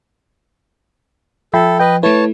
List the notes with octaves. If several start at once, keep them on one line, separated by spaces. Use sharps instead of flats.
F3 A4 E5 G5 B5
B4 D#5 G5
A3 E4 B4 C#5 A5